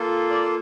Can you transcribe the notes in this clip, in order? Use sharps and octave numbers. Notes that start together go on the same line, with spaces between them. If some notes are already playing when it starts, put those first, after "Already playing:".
Already playing: A#3 F4 A4
D5